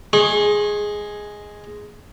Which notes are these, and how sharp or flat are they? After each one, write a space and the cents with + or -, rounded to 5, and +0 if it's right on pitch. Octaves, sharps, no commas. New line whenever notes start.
G#3 +0 C#6 -45